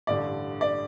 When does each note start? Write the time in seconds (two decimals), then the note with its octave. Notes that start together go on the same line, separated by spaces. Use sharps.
0.07 A1 G2 D3 D5
0.61 D5